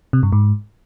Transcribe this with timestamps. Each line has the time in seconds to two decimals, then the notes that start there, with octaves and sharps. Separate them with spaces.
0.13 C3
0.23 G2
0.32 G#2